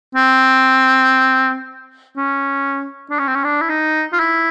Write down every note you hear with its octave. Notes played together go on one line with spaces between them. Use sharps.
C4
C#4
D4
C#4
C4
C#4
D4
E4
D#4
F4
E4